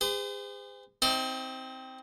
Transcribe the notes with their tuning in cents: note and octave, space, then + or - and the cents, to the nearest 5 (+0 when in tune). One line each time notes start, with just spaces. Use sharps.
G#4 -40 C5 -40
C4 +0 D#4 +45 D5 +35